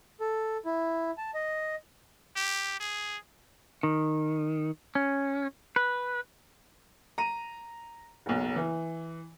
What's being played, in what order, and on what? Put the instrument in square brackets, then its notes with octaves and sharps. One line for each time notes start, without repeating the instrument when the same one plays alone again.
[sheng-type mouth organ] A4
E4
A5
D#5
[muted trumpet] G4
G#4
[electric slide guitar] D#3
C#4
B4
[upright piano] A#5 D#7
F#1 B1
E3